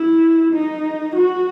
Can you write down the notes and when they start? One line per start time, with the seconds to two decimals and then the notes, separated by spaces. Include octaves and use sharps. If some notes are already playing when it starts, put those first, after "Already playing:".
Already playing: E4
0.54 D#4
1.15 F#4